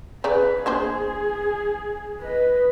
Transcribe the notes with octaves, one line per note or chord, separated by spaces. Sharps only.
C#3 B4 D5 A#5
A#3 D4 G#4 C5
B4 D#5